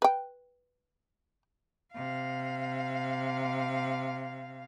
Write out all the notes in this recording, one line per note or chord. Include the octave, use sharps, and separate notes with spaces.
B4 G5
C3 F5